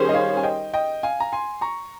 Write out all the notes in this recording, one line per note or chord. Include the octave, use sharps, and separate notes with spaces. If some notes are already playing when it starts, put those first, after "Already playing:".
Already playing: D#3 G3 C#4 G#4 C5
D#5
C#5 F5
G#5
D#5 G5
D#5 G5
F5 G#5
A#5
G#5 C6
A#5 C#6